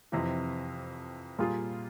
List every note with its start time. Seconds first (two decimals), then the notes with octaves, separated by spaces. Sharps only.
0.12 F2 C3 E3
1.39 A#2 G3 A#3 F4 G#4